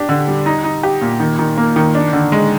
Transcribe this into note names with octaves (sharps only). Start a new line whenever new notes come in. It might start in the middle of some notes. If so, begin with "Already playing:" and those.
Already playing: D4 G4
D3
G3
D#4
D#4
G4
A#2
D#3
D#3
A#3
D#3
D4
D3
G#3